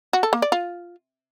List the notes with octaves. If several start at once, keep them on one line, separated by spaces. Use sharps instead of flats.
F#4
A4
A#3
D5
F4